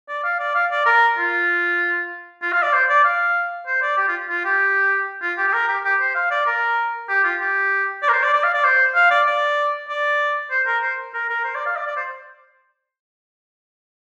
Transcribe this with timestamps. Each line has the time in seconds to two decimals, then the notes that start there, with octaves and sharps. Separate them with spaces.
0.09 D5
0.24 F5
0.39 D5
0.55 F5
0.71 D5
0.85 A#4
1.18 F4
2.42 F4
2.52 F5
2.62 D5
2.73 C5
2.89 D5
3.04 F5
3.67 C5
3.82 D5
3.97 G4
4.08 F4
4.29 F4
4.45 G4
5.22 F4
5.38 G4
5.48 G4
5.53 A#4
5.68 G4
5.84 G4
6.00 C5
6.15 F5
6.31 D5
6.46 A#4
7.09 G4
7.24 F4
7.40 G4
8.02 D5
8.08 A#4
8.12 C5
8.23 D5
8.33 D5
8.44 F5
8.54 D5
8.64 C5
8.95 F5
9.10 D5
9.27 D5
9.89 D5
10.51 C5
10.67 A#4
10.82 C5
11.14 A#4
11.29 A#4
11.44 C5
11.55 D5
11.66 F5
11.76 D5
11.87 D5
11.96 C5